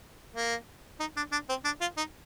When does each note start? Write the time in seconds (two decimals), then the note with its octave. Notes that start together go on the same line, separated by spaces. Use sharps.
0.35 A#3
1.00 D#4
1.17 D4
1.32 D4
1.49 C4
1.65 D4
1.81 F4
1.97 D#4